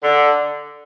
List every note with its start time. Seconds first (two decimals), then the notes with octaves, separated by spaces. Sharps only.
0.03 D3